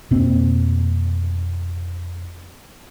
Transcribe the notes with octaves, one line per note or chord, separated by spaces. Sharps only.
F1 B2 A#3 C4